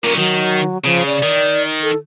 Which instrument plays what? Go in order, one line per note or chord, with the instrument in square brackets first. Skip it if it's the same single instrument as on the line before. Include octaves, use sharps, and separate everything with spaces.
[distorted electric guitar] A#2 C#4 [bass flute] A#4
[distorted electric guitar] D#3 [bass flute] F#3
[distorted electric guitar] C#3 [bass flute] F3
[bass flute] D5
[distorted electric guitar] D#3
[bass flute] A4